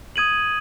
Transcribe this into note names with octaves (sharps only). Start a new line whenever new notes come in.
D#6 G#6 D#7 F#7